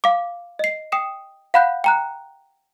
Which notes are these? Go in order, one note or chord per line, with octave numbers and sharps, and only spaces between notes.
F5 D6
D#5 C7
G5 D#6 C7 E7
F5 F#5 B5 F#6 G6
G5 A#5 F#6